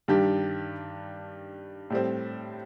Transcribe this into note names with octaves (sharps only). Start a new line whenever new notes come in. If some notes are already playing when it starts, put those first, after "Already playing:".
G2 D#3 G3 D4 G4
A2 G3 C4